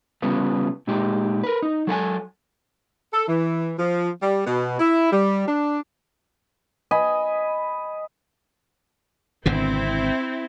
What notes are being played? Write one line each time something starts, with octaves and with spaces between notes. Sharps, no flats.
C#3 G3 B3 F4
A#2 G#3 D#4 G4
A#4 B4
D#4
F#3 A4 F5 G#5
A4
E3
F3
G3
B2
E4
G3
D4
D#5 G#5 B5
G#1 B2 D3 C4 E4